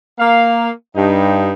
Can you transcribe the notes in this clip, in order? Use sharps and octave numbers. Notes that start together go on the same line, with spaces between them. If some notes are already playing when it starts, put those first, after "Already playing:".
A#3 F5
G2 D#4